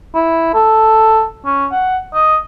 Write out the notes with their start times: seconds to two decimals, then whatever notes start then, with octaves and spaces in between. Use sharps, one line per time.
0.15 E4
0.55 A4
1.45 C#4
1.72 F#5
2.15 D#5